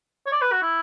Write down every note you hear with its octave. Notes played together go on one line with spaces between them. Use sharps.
C#5
D5
B4
F#4
E4